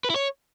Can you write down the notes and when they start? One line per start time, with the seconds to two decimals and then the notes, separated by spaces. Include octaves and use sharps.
0.04 B4
0.10 E4
0.16 C#5